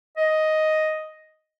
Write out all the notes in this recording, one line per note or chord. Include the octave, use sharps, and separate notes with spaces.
D#5